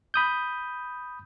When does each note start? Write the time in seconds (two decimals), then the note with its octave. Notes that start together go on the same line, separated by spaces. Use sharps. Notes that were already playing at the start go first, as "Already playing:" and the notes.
0.14 B5 D#6 G6